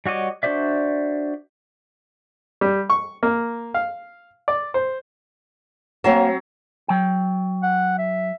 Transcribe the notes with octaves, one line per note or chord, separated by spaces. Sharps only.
G3 F#4 C#5 D#5 D6
D4 F#4 C5 D5 E5
G3
C#6
A#3
F5
D5
C5
F#3 A#3 C4 C#5 A5
F#3 G5
F#5
E5